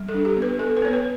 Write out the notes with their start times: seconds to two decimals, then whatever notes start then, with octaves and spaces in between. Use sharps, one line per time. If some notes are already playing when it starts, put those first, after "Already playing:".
Already playing: G3
0.09 A4
0.14 D4
0.25 G4
0.37 B3
0.42 B4
0.59 B3 A4
0.77 B4
0.82 B3 C#5
0.93 B4